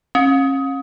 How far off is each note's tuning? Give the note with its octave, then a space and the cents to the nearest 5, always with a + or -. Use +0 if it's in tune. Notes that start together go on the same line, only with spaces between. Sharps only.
C#4 -35